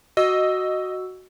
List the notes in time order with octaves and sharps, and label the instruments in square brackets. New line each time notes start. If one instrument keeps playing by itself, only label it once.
[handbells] F#4 E6 [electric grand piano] D#5